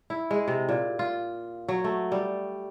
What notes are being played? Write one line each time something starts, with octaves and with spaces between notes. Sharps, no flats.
E4
G#3
C3
A#2
F4
F#3
A3
G3